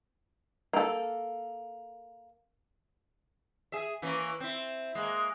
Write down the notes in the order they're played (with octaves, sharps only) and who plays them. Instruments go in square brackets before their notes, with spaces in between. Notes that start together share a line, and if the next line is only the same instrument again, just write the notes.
[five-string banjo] A#3 A4
[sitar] G#4 E5
E3 A#3 C#4
C4 E4
G#3 A#3